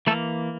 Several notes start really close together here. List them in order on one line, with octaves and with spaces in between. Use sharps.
E3 A3 A4 A#3